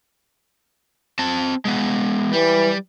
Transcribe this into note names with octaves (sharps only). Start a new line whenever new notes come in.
C4 A5
G#3 B3
E3 G3